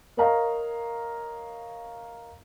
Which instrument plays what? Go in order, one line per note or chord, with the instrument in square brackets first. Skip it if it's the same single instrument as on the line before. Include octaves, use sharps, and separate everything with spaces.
[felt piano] A#4 C#5 D#5 F5 A#5